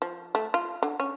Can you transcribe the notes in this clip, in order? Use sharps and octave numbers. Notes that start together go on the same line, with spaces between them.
F3
A3
F4
D3
C#4